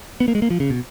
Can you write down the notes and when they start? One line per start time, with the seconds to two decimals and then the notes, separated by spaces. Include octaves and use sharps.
0.20 B3
0.28 A#3
0.35 G#3
0.42 A#3
0.50 F3
0.60 C#3
0.70 B2